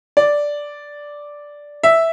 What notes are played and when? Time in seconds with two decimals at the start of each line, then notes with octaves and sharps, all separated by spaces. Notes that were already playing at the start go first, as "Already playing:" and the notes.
0.17 D5
1.83 E5